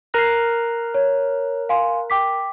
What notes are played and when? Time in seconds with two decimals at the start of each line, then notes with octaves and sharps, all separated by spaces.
0.14 A#4 A#5 F#6 A#6 C7
0.94 C#5
1.69 F5 G#5 C6
2.10 G5 D6 B6